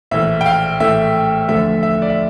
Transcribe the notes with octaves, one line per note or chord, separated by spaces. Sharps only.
A#1 A2 E3 A3 E5
G5
F5
A#1 A2 E3 A3 E5
D2 D3 F3 A3 E5
E5
D5
E5